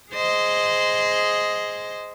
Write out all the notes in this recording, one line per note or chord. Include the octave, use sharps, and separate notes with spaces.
G#4 C5 D#5